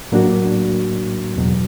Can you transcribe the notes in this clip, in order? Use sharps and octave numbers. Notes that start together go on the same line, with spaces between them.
A2 F#3 A#3 D4 F#4
E2 B2 F#3